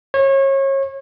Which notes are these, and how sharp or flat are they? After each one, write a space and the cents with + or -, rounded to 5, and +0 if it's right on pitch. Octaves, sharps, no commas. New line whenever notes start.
C#5 -30